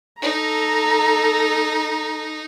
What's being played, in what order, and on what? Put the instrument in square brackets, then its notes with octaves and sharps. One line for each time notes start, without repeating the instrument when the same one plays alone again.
[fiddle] D#4 [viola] A4 A#5